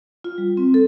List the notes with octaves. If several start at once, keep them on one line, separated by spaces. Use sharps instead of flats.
F4
G3
C4
A4